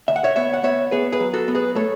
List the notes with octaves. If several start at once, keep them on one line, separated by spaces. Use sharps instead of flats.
D2 E5
F#5
C#5 E5
B3 C#5 E5
F#5
B3 C#5 E5
B3 G#4 B4
G#4 B4
F#3
F#4 A4
B3
G#4 B4
A3 A4 C#5